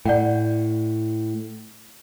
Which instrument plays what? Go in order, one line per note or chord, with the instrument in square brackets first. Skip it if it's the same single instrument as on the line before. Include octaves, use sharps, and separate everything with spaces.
[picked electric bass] A2 [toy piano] D5 F#5 G5